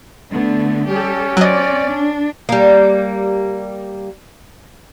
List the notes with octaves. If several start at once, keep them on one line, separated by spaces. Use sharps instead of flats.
D3 A3 B3
G3 C#4 G4 A4
F#3 C4 D5 D#5
D4
G3 A#3